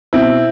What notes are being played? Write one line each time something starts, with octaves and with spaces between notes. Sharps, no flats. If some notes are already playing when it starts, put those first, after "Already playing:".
B2 C4 E4